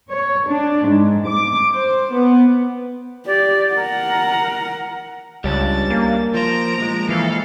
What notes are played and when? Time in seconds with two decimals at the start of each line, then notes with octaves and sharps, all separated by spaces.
0.10 C#5
0.46 D4
0.88 G#2
1.26 D6
1.73 C5
2.15 B3
3.26 G4 D5
3.74 A#4 F#5
5.44 C#2 G3 C#4 D4 A6
5.90 A#3
6.34 F3 C5 A#5 D7
6.78 A#2 F3 G#3
7.09 E3 A4 F5